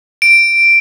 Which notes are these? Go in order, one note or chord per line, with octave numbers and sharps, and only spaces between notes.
D7